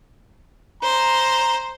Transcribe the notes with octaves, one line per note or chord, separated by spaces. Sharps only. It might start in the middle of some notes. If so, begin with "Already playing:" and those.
C5 A#5